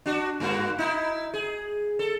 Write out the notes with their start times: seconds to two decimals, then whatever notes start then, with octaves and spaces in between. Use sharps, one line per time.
0.06 D4 F#4
0.40 G2 A#3 F#4
0.78 D#4 E4
1.34 G#4
1.99 A4